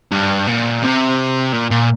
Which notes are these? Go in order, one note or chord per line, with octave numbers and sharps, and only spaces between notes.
G2
A#2
C3
A#2
A#2